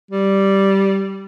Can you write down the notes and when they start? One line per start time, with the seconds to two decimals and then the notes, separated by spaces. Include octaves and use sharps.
0.11 G3